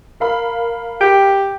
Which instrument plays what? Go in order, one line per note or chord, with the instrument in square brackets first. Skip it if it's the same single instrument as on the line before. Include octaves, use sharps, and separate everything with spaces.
[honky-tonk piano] A#4 F5 B5
[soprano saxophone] G4 [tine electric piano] G5